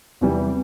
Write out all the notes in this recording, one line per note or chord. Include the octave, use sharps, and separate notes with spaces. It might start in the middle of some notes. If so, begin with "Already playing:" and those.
E2 C3 E3 G3